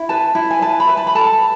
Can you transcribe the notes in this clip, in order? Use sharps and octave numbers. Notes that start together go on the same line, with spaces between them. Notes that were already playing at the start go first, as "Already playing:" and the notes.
Already playing: E4
B4 A5
E4
G#5
B4 A5
B5
B4
A5
B5
A4 A5